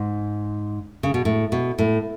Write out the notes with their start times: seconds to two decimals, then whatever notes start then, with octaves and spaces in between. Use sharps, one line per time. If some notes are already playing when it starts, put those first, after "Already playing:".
Already playing: G#2
1.03 C#3
1.14 B2
1.25 A2
1.52 B2
1.78 A2